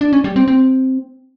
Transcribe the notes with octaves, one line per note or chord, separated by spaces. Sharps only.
D4
C#4
G3
C4
C4